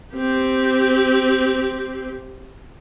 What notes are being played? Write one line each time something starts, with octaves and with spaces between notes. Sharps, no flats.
C4 G4